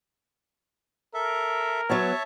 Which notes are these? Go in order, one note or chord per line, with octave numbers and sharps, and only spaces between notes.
A4 A#4 E5
F#3 B3 C#5 E5 A5